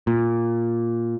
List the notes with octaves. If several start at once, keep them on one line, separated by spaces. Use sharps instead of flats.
A#2